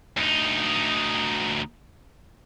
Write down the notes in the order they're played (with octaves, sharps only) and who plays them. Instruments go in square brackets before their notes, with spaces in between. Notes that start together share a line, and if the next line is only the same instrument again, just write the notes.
[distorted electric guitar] D2 D#4